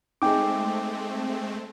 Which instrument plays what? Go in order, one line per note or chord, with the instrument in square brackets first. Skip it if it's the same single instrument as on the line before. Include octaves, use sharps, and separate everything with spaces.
[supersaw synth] G#3 A3 C4 [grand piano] D#4 G#4 [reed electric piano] G5 D6